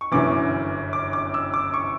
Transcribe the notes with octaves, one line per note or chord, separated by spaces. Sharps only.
C#6
G1 F#2 E3 D6
D6
D6
E6
D6
C#6